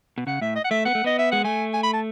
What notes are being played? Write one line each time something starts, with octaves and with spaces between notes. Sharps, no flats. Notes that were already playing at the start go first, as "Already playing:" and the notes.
B2
C#3 F#5
A2 E5
D#5
F#5
A3 E5
B3 F#5
A3
B3 D#5
E5
G#3 F#5
A3 G#5
G#5
B5
A5